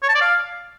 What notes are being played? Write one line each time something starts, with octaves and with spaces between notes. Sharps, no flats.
C#5
A5
D5
F5